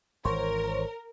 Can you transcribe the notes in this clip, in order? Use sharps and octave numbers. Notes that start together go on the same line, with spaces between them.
G#1 E3 A#4 C5 C#5